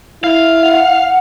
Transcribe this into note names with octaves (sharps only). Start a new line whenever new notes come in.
E4 F5
F#5